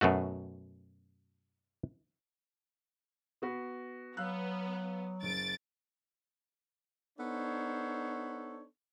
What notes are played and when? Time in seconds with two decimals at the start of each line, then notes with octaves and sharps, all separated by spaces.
0.01 F#2 B2 A3 F#4
3.42 B3 F#4 B4
4.17 F#3 B3 F5 E6 F#6
5.23 F#1 A6 D7
7.19 B3 D4 D#4 A4 C5 C#5